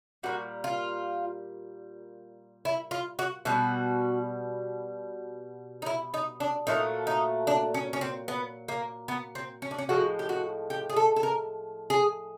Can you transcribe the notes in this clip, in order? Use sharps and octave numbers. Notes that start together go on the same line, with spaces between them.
A#2 G3 F#4
F4
E4
F4
F#4
B2 G3 F#4
D#4
E4
D#4
D4
A#2 F#3 A3 D#4
D#4
D4
C#4
C#4
C4
B3
A#3
B3
C4
C#4
D4
C#4
A2 F3 G#3 F#4
G4
F#4
G4
G#4
A4
A4
A#4
G#4